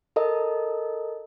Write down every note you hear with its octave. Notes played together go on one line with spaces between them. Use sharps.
A4 A#4 D#5